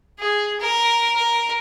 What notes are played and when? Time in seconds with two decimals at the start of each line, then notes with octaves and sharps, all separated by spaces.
0.19 G#4
0.60 A#4
1.16 A#4